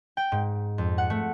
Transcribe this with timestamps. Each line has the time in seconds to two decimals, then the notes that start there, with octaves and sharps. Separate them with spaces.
0.17 G5
0.32 G#2
0.78 F2
0.98 F#5
1.10 A3